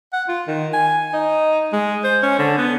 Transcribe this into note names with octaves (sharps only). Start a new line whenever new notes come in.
F#5
F4
D#3
G#5
D#4
G#3
C5
C#4
D3
B3